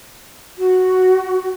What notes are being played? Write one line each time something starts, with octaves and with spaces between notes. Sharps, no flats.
F#4